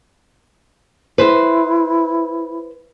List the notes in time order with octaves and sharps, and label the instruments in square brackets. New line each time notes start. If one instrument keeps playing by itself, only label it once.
[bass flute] E4 [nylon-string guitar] B4 C5